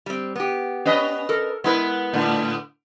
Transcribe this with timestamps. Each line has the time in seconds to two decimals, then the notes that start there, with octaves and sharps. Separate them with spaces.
0.06 G3 C4
0.36 B3 G4
0.85 C#4 B4 D#5
1.29 A4 A#4
1.64 G#3 B3 E4 A#4 B4
2.14 A2 D3